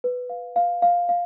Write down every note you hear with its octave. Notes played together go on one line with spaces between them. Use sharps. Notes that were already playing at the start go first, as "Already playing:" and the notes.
B4
F5
F5
F5
F5